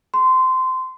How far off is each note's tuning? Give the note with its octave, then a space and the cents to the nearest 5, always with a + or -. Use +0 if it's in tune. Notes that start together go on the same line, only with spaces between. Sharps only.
C6 -15